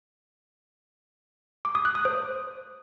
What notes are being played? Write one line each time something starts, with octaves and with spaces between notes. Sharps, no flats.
D6
D#6
F#6
D#6
C5